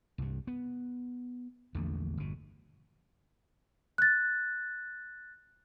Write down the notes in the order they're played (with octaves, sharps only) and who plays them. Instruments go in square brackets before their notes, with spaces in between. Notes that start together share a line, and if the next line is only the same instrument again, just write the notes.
[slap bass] C2 G2
B3
A#1 E2 D3 A3
G1 B2
[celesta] F#6 A6